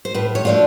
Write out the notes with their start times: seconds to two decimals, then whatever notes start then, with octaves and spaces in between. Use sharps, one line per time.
0.05 C5
0.14 A2 B4
0.35 C#5
0.45 F3 A3 D4 F4